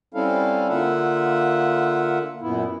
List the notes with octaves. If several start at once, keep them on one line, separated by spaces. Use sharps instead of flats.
G3 C4 C#4 E4 A4 F5
D3 A#3 F4 E5 F#5
F#2 A#2 B3 E4